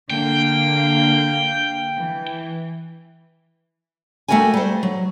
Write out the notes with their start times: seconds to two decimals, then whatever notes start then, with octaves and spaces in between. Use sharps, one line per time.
0.10 D3 A#3 F5 G5
1.96 E3
4.28 A3 A#3 F#4 A#4 G5 G#5
4.54 G3 C5
4.83 F#3